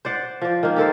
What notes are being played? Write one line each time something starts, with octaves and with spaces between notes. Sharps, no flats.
C5 D5 F#5
F3 D5
D#3 A#3
G4 A4 A#4 C5